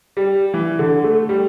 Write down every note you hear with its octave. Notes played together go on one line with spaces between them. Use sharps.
G3
E3
D3
A3
G3